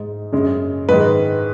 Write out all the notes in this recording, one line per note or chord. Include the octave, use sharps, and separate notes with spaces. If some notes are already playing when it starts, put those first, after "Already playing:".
Already playing: G#2 G#3 D#4
F#2 C#3 G#3
G#2 D#3 G#3 B4